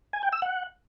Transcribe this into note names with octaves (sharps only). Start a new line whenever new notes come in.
G#5
G5
E6
F#5